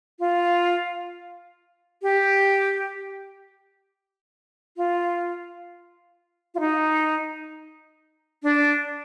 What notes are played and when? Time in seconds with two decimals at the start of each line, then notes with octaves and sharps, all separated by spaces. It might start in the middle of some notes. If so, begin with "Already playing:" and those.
0.19 F4
2.02 G4
4.77 F4
6.55 F4
6.60 D#4
8.43 D4